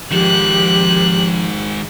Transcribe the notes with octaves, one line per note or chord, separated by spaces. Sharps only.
D#3 F3 G#3 G4 F#6